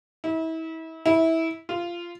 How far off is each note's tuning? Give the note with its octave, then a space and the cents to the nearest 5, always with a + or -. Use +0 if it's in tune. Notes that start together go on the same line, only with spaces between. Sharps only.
E4 -35
E4 -20
F4 -15